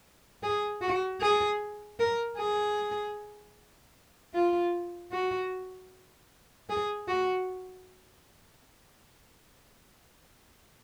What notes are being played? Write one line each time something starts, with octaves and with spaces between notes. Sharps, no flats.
G#4
F#4
G#4
A#4
G#4
F4
F#4
G#4
F#4